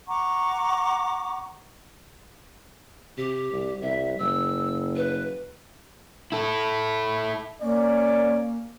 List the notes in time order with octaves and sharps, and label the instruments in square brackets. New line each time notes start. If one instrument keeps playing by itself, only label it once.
[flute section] F#5 A#5 C#6 D6
[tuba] C3 [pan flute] G4
[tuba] C2
[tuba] C2 [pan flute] E5
[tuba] F#1 [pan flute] E6
[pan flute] B4
[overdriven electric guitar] E4 A4
[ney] A#3 [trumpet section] C#4 D5